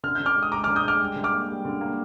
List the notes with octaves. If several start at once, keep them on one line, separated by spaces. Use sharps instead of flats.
D3 F6
D3 G6
D6 F6
G#3
D#6
G#3 A#5 D6
D3 D6 F6
D#6 G6
G#3 D6 F6
G3
D3
D6 F6
A#3
G3
D3
A#3